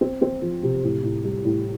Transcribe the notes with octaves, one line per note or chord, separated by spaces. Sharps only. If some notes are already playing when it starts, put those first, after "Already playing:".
C4
C4
F3
C3
A2
A2
G3
A2